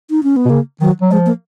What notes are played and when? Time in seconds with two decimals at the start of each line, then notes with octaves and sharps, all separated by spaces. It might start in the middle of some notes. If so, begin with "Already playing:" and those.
0.10 D#4
0.23 C#4
0.36 B3
0.45 B2
0.50 C#3 A#3
0.80 D#3 F#3
1.02 F#3
1.11 F3 G#3
1.26 A#3